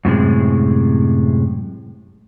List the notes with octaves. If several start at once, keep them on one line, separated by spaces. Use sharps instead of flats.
F#2 A2 C3 G#3